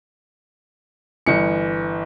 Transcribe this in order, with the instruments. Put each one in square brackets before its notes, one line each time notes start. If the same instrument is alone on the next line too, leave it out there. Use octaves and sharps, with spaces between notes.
[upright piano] G1 E3 C#7